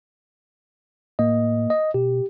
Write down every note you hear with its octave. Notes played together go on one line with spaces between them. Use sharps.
A2 A#3 D#5
D#5
B2 G4